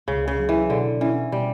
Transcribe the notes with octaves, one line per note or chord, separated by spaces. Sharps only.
C#2 C#3
C#3
F#3
E3
B2 D3
E3 C#4
B2 G3